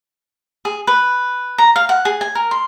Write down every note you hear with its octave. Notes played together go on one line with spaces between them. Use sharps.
G#4
B4
A#5
F5
F#5
G#4
G#5
A#4
C6